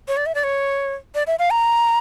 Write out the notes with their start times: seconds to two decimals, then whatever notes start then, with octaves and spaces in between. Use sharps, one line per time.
0.08 C#5
0.17 D5
0.26 E5
0.35 D5
0.44 C#5
1.15 D5
1.27 E5
1.39 F5
1.50 A#5